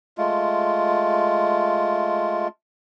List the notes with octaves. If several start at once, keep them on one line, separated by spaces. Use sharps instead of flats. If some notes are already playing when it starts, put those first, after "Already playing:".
G#3 A3 F4